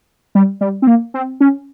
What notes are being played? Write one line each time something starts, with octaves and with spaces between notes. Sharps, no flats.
G3
G3
C4
A#3
C4
C#4